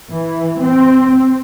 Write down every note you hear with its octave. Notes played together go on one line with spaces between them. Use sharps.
E3
C4